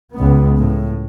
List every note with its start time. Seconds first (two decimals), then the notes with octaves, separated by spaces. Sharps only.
0.15 C#2 B3
0.58 A2